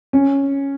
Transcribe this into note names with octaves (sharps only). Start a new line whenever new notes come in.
C#4